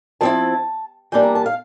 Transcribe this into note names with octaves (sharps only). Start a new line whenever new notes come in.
F3 C4 E4 A5
E3 G3 A#3 D4 G5
A#5
A5
F5